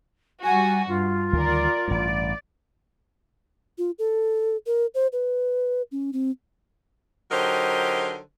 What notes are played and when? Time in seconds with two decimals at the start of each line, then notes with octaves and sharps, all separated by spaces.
0.43 G3 F#4 G#5
0.88 G2 F4
1.33 D2 D#3 G3 A#4 D5
1.88 A1 G2 D5
3.78 F4
3.99 A4
4.66 A#4
4.95 C5
5.13 B4
5.92 C#4
6.13 C4
7.31 D3 F#3 D#4 G4 A#4 C5